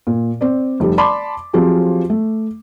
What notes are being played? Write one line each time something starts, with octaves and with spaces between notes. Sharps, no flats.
A#2
C4 D5
F1 G3
D5 A5 B5 C6 D6
F3 F#3 C4 F4 G4 G#4
A3